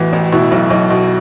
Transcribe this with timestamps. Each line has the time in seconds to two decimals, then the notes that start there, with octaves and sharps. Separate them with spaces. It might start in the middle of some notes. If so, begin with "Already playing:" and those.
Already playing: A1 A2 E3 F#4
0.13 A1
0.32 B2 E4
0.52 B1
0.70 B1
0.90 B2